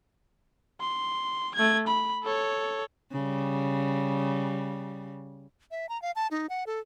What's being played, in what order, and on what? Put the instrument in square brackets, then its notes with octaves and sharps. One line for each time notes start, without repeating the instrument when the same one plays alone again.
[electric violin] C6
A3 G#6
B5
A4 C#5
[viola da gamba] C#3 G3
[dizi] E5
A#5
F5
A5
D#4
F#5
A4